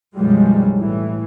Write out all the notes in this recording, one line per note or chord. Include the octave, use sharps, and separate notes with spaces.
B1 F#2 F3 G3 G#3
A2 E3